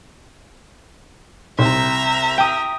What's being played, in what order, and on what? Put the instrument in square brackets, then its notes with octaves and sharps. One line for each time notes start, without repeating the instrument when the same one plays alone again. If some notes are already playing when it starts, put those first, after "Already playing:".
[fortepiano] C2 [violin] E5 A#5
[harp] G5 D#6